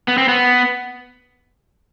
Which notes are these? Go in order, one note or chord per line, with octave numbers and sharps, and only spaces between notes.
B3
C4
B3